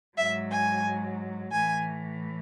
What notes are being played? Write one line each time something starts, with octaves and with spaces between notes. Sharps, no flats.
G#2 F#3 E5
G#5
A2 E3 G#5